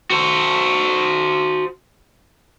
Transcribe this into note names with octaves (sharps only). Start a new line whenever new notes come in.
F#4 C5